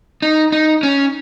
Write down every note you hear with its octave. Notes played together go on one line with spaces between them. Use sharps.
D#4
D#4
C#4